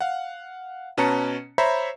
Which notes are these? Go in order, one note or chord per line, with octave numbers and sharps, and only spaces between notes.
F5 F#5
B2 C#4 B4 A5 A#5 C#7
C5 C#5 E5 A#5 B5